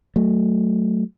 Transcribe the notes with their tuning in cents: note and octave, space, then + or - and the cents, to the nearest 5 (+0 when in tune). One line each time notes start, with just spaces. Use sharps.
F#3 +20 A3 +0